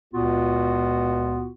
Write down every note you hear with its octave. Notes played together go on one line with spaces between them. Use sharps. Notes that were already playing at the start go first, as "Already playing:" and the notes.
C#2 A#2 B3 F4 F#4